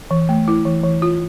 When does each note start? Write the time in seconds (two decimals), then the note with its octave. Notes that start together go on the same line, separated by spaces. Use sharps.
0.11 E3
0.29 A3
0.48 E4
0.65 E3
0.84 E3
1.02 F4